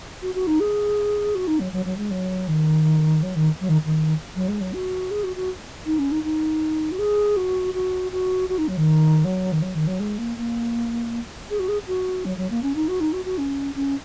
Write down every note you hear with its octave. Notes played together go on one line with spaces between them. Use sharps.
F#4
F#4
D#4
G#4
F#4
D#4
F#3
F#3
F#3
G#3
F#3
D#3
F#3
D#3
F#3
D#3
D#3
F#3
G#3
F#3
F#4
G#4
F#4
F#4
D#4
C#4
D#4
D#4
F#4
G#4
F#4
F#4
F#4
F#4
D#4
F#3
D#3
F#3
D#3
F#3
D#3
F#3
G#3
A#3
A#3
G#4
F#4
G#4
F#4
F#3
F#3
A#3
C#4
D#4
F#4
D#4
F#4
F#4
C#4
C#4